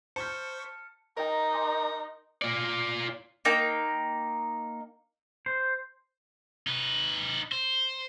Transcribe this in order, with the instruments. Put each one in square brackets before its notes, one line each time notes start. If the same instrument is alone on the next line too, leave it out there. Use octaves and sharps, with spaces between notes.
[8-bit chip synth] C5 C#6 B6 [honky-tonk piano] A5 G6 [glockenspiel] F6 C#7
[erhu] D#4 [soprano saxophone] A#4 [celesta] D#5 G5
[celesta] G#5 C6 D6
[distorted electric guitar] F4 D5
[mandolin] A#3 D#4 G5
[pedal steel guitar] C5
[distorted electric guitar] D#4 B4
C5